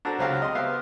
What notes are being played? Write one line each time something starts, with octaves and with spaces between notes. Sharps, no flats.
D4 F#4 A4 C5 A#5
C#2 F#3 C4 G4 F5
D#5 C6
B3 G4 C5 E5 F5 C6